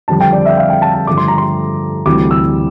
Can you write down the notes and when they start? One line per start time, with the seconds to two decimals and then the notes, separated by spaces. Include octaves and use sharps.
0.08 F2 D3 G3 A5
0.20 G5
0.33 D5
0.45 E5
0.57 F5
0.70 G5
0.82 A5
0.94 A5
1.07 G2 D3 F3 A3 D6
1.17 C6
1.28 A#5
1.38 C6
2.05 D2 C3 E3 G3 D6
2.31 E6